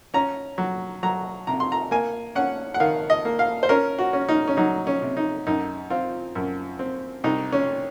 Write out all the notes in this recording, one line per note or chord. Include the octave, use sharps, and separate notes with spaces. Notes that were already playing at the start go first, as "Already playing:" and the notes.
C#4 A#5
F#3
F#3 A#5
C3 A#5
C6
A#5
A#3 G#5
C#4 F#5
F#5
D#3 F5
D#5
A#3
F5
C5
C#4 A#4
F#4
C#4
D#4
C#4
F#3 D#4
C#4
C3
D#4
F#2 D#4
C4 F4
F#2
C4
C2 D#4
C#4